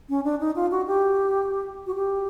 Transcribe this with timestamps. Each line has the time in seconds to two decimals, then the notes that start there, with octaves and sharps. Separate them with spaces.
0.09 C#4
0.24 D4
0.40 D#4
0.56 F4
0.71 F#4
0.87 G4
1.87 F#4
1.95 G4